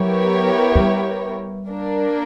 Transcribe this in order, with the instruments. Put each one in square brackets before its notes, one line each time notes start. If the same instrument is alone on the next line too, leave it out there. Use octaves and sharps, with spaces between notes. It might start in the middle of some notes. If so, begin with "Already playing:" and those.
Already playing: [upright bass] F#3 [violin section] B3 E4 G4 A#4 C#5
[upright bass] G3
[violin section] A#3 D4 A#4